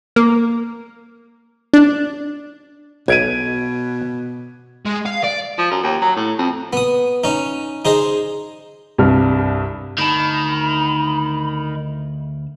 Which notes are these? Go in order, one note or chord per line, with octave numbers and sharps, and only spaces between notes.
A#3
D4
B1 B2 G#6 D7 D#7
G#3
F5
D5
F3
F#2
D#2
F#3
A2
F2
B3 D#6
C#4 D#4
D#4 G#4 C5 D#5
C2 G2 F6
D2 D#3 A5 B5